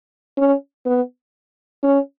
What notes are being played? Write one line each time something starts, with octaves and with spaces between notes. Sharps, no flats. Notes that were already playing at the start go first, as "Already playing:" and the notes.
C#4
B3
C#4